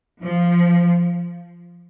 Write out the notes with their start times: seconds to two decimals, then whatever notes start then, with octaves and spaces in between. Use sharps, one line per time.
0.23 F3